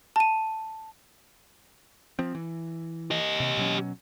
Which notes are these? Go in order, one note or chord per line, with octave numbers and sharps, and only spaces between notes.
A5 D#7
F3 C4
E3
G4 D#5
C3
B2 F#3 C#4